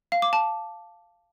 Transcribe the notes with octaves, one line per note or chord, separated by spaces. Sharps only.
F5
D6
A5